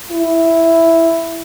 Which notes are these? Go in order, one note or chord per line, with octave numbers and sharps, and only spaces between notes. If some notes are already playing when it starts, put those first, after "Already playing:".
E4